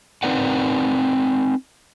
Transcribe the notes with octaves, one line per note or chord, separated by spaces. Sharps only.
C4 D#4 A#4 B4 D5 F#5